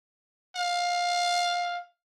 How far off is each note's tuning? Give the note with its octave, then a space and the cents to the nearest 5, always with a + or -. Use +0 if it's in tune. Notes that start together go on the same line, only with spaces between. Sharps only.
F5 +15